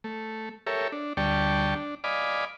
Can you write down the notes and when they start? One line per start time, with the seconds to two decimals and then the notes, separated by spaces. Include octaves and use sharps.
0.04 A3
0.67 G4 A4 A#4 C#5 E5
0.92 D4
1.17 D2 G3 D5 G5 A5 C#6
1.75 D4
2.04 D5 D#5 F5 G#5 B5 D6